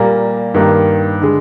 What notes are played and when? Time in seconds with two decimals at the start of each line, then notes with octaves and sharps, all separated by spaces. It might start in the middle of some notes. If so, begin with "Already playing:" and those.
Already playing: A#2 G3 A#3
0.54 G2 D#3 A#3
1.22 D3 G#3